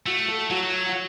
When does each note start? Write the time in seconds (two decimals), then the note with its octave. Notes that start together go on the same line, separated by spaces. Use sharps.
0.06 A3 F#4
0.28 A4
0.51 F#3 F#4
0.89 F#4